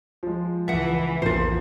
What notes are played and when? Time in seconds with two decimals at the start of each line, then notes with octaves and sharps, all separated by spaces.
0.23 F3 G#3
0.68 C#2 E3 E5 F#5
1.22 A#1 E2 F3 A#3 F4 C5